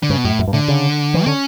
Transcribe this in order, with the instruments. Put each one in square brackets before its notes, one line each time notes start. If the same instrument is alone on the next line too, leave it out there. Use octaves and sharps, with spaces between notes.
[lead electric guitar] D3
[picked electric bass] G2 [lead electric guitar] C#3
[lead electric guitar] B2
[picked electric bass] F#2 [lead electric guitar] A2
[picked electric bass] F#2
G2
[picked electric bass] A2 [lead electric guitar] D3
[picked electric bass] C#3
E3
[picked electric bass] D3 [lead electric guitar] C#4